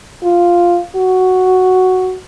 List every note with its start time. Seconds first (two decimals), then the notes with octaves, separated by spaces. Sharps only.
0.24 F4
0.96 F#4